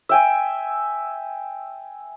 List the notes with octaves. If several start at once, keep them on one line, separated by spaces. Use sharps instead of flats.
E5 G5 G#5